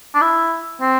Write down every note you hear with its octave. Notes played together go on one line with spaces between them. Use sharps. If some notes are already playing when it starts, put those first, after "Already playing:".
D4
E4
C4